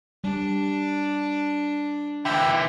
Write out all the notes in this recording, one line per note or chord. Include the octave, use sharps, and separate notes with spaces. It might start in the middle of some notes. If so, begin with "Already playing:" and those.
G3 D4
D3 E3 E5 G5